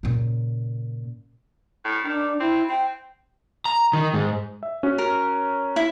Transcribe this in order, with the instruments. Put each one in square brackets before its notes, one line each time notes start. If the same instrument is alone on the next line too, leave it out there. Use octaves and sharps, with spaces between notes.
[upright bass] A#2 C#3
[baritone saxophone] A2
[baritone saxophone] D#3 [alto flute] D4
[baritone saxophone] C4 [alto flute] E4
[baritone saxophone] C4 [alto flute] G5
[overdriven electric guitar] A#5
D#3
G#2
[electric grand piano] E5
C#4 F#4
[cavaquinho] A#4
E4